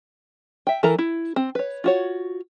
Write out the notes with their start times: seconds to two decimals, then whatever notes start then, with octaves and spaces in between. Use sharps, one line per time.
0.67 E5 G5
0.83 E3 A4 A#4 A#5
0.99 E4
1.36 C4
1.55 B4 C#5
1.84 F4 F#4 C#5